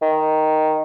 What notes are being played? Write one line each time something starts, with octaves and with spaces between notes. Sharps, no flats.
D#3